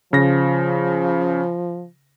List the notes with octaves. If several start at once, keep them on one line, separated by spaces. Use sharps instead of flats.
C#3 F3 A#6